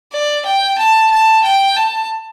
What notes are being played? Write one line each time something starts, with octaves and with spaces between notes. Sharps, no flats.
D5
G5
A5
A5
G5
A5